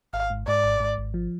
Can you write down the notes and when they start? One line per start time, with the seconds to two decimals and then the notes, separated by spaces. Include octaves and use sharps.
0.13 G#1 F5
0.30 G#2
0.47 G#2 D5
0.64 G#1
0.80 G#2
0.98 G#1
1.14 F3